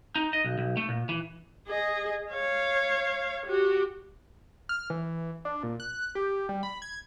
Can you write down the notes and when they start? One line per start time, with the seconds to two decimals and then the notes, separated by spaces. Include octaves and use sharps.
0.16 D#4
0.33 D#5
0.44 B1
0.58 B1
0.77 A3
0.89 A#2
1.09 E3
1.67 G#4 D#5
2.32 C#5 F5
3.46 F#4 G4
4.69 F6
4.90 E3
5.45 D4
5.63 A#2
5.80 F#6
6.15 G4
6.49 G3
6.63 B5
6.82 G#6